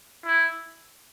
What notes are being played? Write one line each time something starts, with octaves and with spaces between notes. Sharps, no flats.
E4